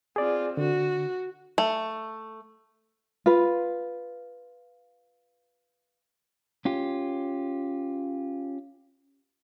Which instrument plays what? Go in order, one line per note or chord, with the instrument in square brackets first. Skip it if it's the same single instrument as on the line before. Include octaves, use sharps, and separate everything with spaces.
[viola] C4 F4 [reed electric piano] G#4 D5
[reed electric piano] D3 [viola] F#4
[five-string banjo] A3
[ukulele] F4 B4
[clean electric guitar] C#4 F4 G4